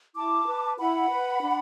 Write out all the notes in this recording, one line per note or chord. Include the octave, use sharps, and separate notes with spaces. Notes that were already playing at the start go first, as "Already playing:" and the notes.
E4 A5 D6
B4
E4 F#5 B5
B4
D4